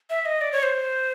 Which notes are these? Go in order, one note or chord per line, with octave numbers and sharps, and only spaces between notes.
E5
D#5
D5
C#5
C5